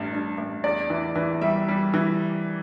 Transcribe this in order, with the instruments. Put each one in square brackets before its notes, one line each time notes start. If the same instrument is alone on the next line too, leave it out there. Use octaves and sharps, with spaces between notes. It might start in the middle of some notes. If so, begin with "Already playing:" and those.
Already playing: [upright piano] A1 G2
G2
A1
E2 D5
E3
E3
G3 E5
G3
E3